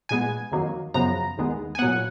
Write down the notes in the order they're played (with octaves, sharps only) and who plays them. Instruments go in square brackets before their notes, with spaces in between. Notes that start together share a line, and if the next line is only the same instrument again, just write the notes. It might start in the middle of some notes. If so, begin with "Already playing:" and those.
[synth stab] A#2 G#3 B3 G#5
F2 D#3 F#3 A#3
F#2 C#3 F3 B3 A#5
D#2 D#3 G#3 B3
G#5
A#2 F#3 B3 F#5